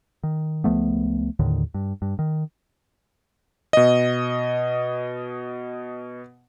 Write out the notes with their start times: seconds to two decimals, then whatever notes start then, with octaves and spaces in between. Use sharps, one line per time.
0.23 D#3
0.64 C#2 F3 A3 B3
1.39 D#2 A2 D3 D#3
1.74 G2
2.02 G2
2.19 D#3
3.73 B2 D#5